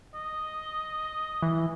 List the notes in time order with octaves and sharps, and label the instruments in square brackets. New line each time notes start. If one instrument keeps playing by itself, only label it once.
[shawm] D#5
[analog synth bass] E3